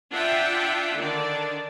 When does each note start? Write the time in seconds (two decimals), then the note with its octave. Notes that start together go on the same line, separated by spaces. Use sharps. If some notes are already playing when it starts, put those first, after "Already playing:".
0.13 D4 F4 E5 F#5 G5
0.97 D3 D#3 D4 D5